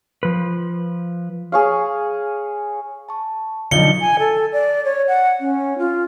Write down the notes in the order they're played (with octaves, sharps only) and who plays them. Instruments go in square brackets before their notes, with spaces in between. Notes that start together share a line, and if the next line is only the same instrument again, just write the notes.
[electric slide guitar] F3 B4
[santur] G#4 C#5 F5
[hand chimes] A5 C#6
[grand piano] B1 F3 D#4 [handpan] D3 [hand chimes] D5 D#5 [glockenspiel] C#7 G7
[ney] G#5
A4
D5
C#5
F#5
C#4
F4